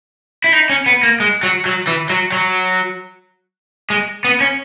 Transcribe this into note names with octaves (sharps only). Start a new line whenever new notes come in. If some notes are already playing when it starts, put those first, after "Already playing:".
E4
D#4
C#4
B3
A#3
G#3
F#3
F#3
E3
F#3
F#3
G#3
B3
C#4